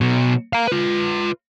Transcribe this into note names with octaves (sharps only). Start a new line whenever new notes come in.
B2 F#3
F5 A#5
F4 B4